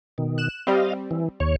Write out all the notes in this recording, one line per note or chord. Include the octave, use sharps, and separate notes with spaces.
B2 D#3
F#6 E7
G3 C4 D#5 F5
E3
D#2 C#5